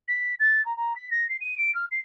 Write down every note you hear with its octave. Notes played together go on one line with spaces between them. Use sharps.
B6
A6
A#5
A#5
B6
A#6
C7
D#7
D7
F6
C7